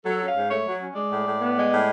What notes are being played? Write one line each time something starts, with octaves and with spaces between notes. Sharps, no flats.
F#3 A4
C#4
F5
G#2
A3 C#5
F#3
C#4
G#3 D5
A2
A2
B3
G#3
A2